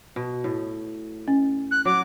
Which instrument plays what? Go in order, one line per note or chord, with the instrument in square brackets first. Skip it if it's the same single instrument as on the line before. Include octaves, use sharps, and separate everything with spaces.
[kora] B2
A2
[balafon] C#4
[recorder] F#6
[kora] F#3 [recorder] D6